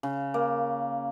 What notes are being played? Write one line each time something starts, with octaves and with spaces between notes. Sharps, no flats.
C#3
A#3